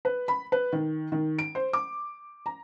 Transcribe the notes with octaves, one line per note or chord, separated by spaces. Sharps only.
B4
B5
B4
D#3
D#3
D7
C5
D6
A#5